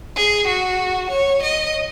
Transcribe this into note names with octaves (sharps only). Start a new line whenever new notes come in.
G#4
F#4
C#5
D#5